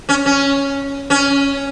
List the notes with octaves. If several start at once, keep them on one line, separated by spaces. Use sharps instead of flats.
C#4
C#4
C#4